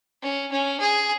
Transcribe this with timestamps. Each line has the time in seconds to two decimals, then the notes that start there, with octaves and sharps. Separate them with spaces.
0.22 C#4
0.51 C#4
0.80 G#4